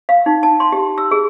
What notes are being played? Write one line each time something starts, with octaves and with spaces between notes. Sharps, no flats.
F5
D#4
A5
C6
G4
E6
G#4